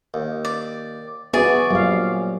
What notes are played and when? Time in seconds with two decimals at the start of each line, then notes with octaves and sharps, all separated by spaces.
0.14 D#2
0.45 D5
1.34 E3 B3 F#4 G#4 D5
1.71 A#1 F#3 G3 F5